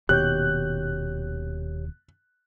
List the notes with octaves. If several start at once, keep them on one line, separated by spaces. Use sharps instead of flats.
D#1 D#2 B2 G4 C#5 F#6 G6